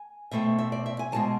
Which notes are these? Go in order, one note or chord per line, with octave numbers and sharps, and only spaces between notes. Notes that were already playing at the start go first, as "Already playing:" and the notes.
Already playing: G#5
B2 A3 C4 E5
E5
D5
E5
G#5
E2 B2 G#3 A5